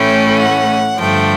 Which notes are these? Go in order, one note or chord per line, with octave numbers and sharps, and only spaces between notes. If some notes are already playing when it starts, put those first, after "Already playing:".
Already playing: A2 E3 A3 C#4 G5
F#5
G2 D3 F3 A3 G5